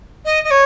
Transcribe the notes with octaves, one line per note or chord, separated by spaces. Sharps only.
D#5
D#5
C#5